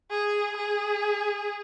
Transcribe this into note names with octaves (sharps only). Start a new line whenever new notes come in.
G#4
G#4